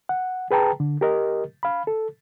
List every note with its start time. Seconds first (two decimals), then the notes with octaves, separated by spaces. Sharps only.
0.09 F#5
0.51 G#4 B4 G5 A5 A#5
0.80 D3
1.01 G4 A#4 D#5
1.63 F5 B5
1.87 A4